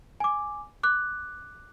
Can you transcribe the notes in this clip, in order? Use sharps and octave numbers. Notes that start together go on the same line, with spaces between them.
G#5 D6
D6 F#6